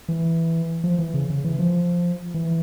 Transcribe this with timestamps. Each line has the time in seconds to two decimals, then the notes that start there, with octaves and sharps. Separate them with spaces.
0.09 E3
0.84 F3
0.98 E3
1.14 C#3
1.30 C#3
1.44 E3
1.59 F3
2.34 E3